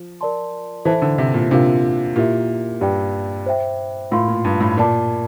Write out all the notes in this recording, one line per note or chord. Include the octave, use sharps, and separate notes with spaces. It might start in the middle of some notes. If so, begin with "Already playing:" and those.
Already playing: F3
A#4 D5 A5 C6
E3 A4 C5 E5 A5
D3
C3
A#2
C3 D4 F4 A#4 F5
A#2 E4 G4 A#4 E5
G2 G4 D5 G5
C5 E5 G5
A2 F4 A#4 F5 C6
A#2
G2
A2
A#2 A#4 D5 A5 D6